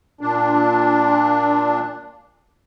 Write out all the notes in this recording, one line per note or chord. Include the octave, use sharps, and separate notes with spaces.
A#2 D4